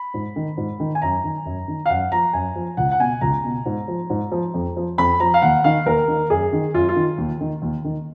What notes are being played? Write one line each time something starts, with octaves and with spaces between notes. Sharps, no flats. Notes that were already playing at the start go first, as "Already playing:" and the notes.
Already playing: B5
G#2
D#3
G#2
D#3
G#5
F#2 A#5
D#3
F#2
D#3
F5
F#2 F#5
F3 A#5
F#2 G#5
F3
C#2 F#5
F#5
B2 G#5
C#2 A#5
B2
G#2
F3
G#2
F3
F2
F3
F2 B5
F3 A#5
F5
D#2 F#5
D#3 F5
D#2 A#4
D#3
F#2 G#4
D#3
F#2 F4
F4
D#3
D#2
D#3
D#2
D#3